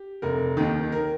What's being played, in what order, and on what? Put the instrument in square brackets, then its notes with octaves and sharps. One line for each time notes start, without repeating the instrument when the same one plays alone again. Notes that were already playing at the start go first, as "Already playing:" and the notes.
Already playing: [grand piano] G4
F1 A#4
D#2 D#3
A#4